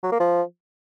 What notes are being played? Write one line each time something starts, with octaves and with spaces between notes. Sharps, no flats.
F#3
A#3
F3